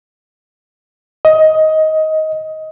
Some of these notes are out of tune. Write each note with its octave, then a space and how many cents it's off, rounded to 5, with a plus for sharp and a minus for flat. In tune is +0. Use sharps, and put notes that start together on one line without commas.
D#5 +15